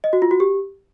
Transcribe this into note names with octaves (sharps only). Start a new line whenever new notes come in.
D#5
F#4
F4
F#4
G4